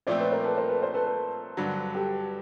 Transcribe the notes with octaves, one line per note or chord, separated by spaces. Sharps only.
A#2 F3 A3 C4 C5 D5
B4 C#5
A#4 C5
A4 B4
A#4 C5
A4 B4
A#4 C5
A4 B4
A4 B4
G2 D3 F#3
G4 A4